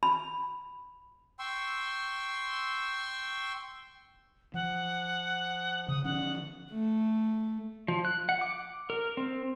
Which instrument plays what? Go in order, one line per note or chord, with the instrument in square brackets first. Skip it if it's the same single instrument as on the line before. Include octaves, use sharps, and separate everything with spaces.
[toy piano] B5
[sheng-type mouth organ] G5 C6 C#6 E6
[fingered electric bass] F3 [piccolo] F#5
[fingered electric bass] C#3 [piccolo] D#6
[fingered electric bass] D3 F3 C#4 [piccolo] F#5
[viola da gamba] A3
[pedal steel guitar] F3
F#6
F#5
D6
A#4
C4